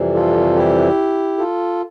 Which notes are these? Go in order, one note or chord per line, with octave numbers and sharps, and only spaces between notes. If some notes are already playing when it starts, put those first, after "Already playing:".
Already playing: F2 C3 E3 G3
F4 A4
E4 G4
F4 A4